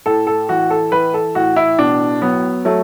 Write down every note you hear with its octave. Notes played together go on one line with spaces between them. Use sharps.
A2 A4
A4
E3 F#4
A4
E3 B4
A4
A2 F#4
E4
B2 D4
F#3 B3
F#3 A3